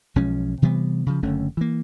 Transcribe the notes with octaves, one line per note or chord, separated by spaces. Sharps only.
B1 F3 G#3 C#4
C3 E3 G3 B3
C#3 F3
F#1 D3 A3 C#4
E3 A#3